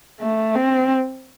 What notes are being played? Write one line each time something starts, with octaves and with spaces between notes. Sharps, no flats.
A3
C4